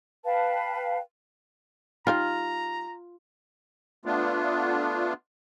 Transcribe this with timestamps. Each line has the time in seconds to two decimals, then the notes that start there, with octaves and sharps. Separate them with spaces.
0.25 B4 F5 G5 A5
2.07 G3 D#4 F4 F5 A#5
4.05 A3 B3 D4 F4